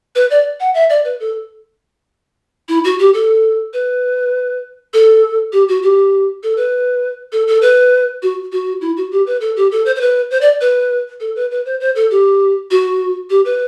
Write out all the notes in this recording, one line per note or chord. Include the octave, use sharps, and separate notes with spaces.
B4
D5
F#5
E5
D5
B4
A4
E4
F#4
G4
A4
B4
A4
G4
F#4
G4
A4
B4
A4
A4
B4
F#4
F#4
E4
F#4
G4
B4
A4
G4
A4
C5
C5
B4
C5
D5
B4
A4
B4
B4
C5
C5
A4
G4
F#4
G4
B4